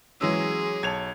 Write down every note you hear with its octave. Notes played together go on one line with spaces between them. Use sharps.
E3 F#3 G#3 C#4 G#4 E6
B1 C#5 A5 G#6 F7